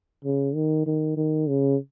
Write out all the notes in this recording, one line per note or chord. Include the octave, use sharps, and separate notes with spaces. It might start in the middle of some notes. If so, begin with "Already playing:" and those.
C#3
D#3
D#3
D#3
C#3